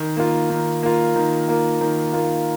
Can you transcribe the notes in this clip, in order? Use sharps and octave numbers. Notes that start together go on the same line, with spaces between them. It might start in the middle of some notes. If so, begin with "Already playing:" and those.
Already playing: D#3
A#3 F4
D#3
A#3 F4
D#3
A#3 F4
D#3
A#3 F4